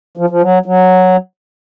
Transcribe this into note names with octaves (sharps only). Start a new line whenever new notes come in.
F3
F3
F#3
F#3